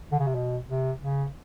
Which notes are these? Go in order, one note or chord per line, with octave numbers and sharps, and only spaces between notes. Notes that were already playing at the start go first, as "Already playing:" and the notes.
D3
C#3
C3
B2
C3
C#3